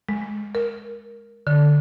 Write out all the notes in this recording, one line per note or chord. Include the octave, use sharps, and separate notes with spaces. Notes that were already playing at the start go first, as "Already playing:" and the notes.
G#3
A#4
D3